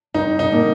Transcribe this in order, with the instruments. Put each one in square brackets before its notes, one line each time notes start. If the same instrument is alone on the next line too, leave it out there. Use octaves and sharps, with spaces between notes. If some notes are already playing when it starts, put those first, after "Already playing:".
[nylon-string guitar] G2 [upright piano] D#4
[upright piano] D#4
[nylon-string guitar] D3 G3 A#3